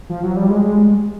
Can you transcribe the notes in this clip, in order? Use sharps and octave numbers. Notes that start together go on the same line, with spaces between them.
F3
F#3
G3
G#3